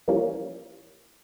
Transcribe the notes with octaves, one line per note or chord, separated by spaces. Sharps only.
E3 F3 G3 A#3 C#4